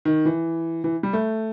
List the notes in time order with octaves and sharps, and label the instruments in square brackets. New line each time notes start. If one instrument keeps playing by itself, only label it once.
[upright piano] D#3
E3
E3
G3
A3